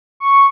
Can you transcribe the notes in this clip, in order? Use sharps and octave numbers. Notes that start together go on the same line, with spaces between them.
C#6